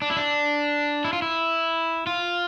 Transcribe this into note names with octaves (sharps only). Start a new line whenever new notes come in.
D4
E4
D4
E4
F4
E4
F4